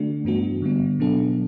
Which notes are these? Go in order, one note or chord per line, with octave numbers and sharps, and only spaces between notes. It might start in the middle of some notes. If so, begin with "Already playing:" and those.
Already playing: D3 A3 D4 F#4
G2 E3 B3 D4 F#4
D3 G3 B3
B2 F#3 B3 D4 A4